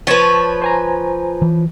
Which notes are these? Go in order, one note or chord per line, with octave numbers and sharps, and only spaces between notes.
F3 B4 C#5 A5
C5 G#5 A#5
E3